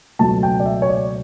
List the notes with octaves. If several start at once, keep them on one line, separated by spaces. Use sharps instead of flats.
C#2 B2 F#3 A3 A5
G5
D5
E5
C#5
D5